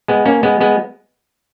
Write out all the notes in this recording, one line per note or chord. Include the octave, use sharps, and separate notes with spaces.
G#3 B3
A#3 C#4
G#3 B3
G#3 B3